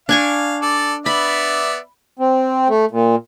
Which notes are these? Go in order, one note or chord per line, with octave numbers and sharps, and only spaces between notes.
D4 F5 G#5 C#6
A4 D5
B3 D5 E5 B5
C4
A3
A#2